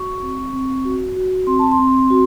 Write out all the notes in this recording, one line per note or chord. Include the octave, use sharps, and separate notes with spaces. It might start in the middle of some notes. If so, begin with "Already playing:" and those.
Already playing: F#4 C#6
C4
C4
F#4
F#4
C4 C6
A5
C6
C4
F#4